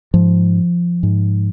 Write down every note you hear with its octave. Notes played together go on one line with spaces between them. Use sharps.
G#2 F3
G#2